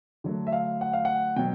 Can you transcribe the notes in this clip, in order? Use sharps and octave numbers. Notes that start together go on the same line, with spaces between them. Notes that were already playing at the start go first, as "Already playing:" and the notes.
D3 F#3 A3
E5
F5
F#5
F5
F#5
B2 F#3 G5